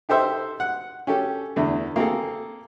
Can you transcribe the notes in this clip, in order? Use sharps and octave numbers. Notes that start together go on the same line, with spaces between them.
D#4 G4 A4 C5 E5
F#5
C#4 G4 A4
E2 D3 A3
A#3 C4 G#4 A4